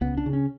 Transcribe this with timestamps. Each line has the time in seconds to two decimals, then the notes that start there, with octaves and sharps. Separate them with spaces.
0.01 C#2 B3
0.17 D4
0.26 C#3
0.33 C#4